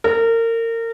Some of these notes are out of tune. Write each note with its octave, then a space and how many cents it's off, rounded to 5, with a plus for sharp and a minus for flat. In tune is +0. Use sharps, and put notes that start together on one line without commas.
A#4 -30